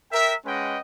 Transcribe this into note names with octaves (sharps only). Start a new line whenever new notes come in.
A#4 E5 G5
G#3 C#4 B4 D#5 F#5 G5